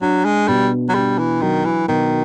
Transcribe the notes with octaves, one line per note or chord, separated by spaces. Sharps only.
F#3 D4
G#3
B2 G3
F#3
G3 D4
E3
D#3 F#3
E3
B2 D#3